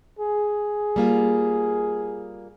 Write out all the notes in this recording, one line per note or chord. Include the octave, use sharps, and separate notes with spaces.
G#4
G3 A#3 F4